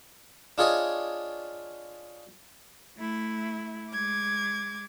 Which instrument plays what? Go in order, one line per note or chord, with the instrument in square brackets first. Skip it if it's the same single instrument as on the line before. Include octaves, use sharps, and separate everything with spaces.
[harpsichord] D4 F4 G#4 C#5 D#5
[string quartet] A3 E4
G#3 D6 G#6